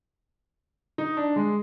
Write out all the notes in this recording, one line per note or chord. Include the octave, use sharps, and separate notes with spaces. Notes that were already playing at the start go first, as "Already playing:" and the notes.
D#4
D4
G#3